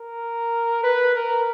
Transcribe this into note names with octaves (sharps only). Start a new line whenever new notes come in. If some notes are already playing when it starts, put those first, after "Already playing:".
Already playing: A#4
B4
A#4